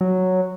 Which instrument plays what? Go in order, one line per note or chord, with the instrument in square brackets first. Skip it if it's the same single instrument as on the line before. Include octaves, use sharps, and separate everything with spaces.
[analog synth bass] F#3